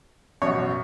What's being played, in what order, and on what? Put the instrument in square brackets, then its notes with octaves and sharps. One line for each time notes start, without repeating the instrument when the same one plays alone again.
[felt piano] A1 F#2 B2 [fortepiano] C#5